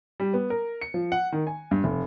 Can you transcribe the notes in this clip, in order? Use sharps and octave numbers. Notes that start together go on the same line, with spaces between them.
G3
B3
A#4
C#7
F3
F#5
D#3
G#5
G2
F1